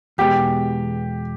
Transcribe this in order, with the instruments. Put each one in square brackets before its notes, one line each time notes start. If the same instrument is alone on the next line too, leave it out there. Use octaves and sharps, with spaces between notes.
[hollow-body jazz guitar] E2 B2 G#3 B3 [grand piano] G4